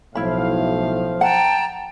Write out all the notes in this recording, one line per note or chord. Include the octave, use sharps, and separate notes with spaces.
B1 A2 F3 E4 F5 B5
F#5 G5 A5 A#5